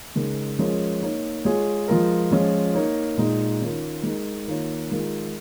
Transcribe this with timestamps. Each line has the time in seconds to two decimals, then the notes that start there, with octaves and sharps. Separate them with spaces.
0.15 C#3 G#3 D#4 A#4
0.59 F3 G#3 C#4 A#4 C#5
1.01 A#3 D#4 C#5
1.45 G#3 F4 G#4 C#5
1.88 F3 G#3 F4 A#4
2.31 F3 G#3 C#4 F4
2.75 A#3 D#4 A#4 C#5
3.17 A#2 G#3 D#4
3.61 D#3 C#4 F4 A#4
4.03 G#3 D#4 A#4
4.47 D#3 A#3 F4 A#4 C#5
4.90 D#3 G#3 F4 A#4